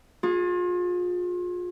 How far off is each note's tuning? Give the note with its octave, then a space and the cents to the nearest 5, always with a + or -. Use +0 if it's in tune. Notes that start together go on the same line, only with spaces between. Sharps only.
F4 +35 G#4 -5